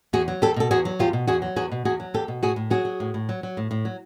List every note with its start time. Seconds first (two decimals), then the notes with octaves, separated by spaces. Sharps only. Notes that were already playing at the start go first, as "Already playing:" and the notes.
0.13 E2 F#4 G#4
0.28 F#3
0.42 E2 G4 A4
0.56 B2 A4
0.71 E2 F#4 G#4
0.85 F#3
0.99 E2 F4 G4
1.13 B2
1.27 E2 F#4 G#4
1.42 F#3
1.56 E2 F#4 G#4
1.72 B2
1.85 E2 F#4 G#4
2.00 F#3
2.14 E2 G4 A4
2.28 B2
2.42 A2 F#4 G#4
2.56 A2
2.70 F#3 F#4 G#4
2.85 F#3
3.00 A2
3.14 A2
3.29 F#3
3.43 F#3
3.57 A2
3.71 A2
3.85 F#3